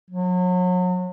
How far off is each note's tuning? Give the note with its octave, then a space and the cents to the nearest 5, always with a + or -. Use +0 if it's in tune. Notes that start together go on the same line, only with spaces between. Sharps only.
F#3 -35